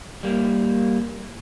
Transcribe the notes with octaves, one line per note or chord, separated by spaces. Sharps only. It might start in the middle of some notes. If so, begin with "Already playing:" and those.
G3 A#3